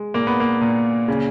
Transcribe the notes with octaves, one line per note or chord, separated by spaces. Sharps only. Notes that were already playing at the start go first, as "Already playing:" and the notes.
Already playing: G#3
A#2 A#3
B3
A#3
A#2
C#3